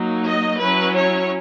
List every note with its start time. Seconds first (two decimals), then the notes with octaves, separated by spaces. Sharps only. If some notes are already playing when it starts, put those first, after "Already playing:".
Already playing: F#3 A#3 D#4
0.24 D#5
0.58 F#3 C#4 E4 B4
0.93 C#5